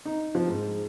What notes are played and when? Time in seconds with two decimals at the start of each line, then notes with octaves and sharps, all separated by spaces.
0.05 D#4
0.35 F3
0.49 G#2